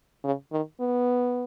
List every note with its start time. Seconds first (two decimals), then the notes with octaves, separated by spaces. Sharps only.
0.24 C#3
0.52 D#3
0.81 B3